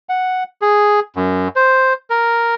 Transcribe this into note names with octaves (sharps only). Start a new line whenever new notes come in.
F#5
G#4
F#2
C5
A#4